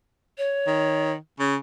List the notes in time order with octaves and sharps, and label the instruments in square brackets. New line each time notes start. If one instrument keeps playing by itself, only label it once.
[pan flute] C#5
[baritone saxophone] D#3
C#3